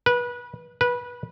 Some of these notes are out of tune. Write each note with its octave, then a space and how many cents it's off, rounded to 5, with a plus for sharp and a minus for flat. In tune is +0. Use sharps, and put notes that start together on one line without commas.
B4 -25
B4 -20